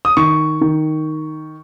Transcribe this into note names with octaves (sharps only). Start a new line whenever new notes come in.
D#6
D#3 C#6
D#3